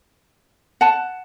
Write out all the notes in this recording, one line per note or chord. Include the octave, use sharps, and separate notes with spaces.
F#5 A5